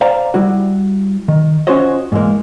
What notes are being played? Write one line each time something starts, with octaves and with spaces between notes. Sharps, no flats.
C5 D5 F5 G5 A#5
G3 E4 F#4
D#3
C#4 F4 F#4 C5 C#5 D#5
G#2 D3 E3 G#3 A#3